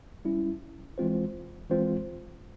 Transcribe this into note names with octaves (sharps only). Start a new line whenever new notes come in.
G3 C#4 E4
E3 G#3 C4 F4 C5
E3 G#3 C4 F4 C5